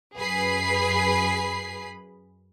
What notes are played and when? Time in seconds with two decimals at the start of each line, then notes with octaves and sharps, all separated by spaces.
0.17 F#2 G#4 B4 B5 C7